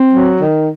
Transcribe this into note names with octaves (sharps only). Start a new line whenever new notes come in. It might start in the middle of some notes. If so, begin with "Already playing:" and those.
Already playing: C4
F#3
D#3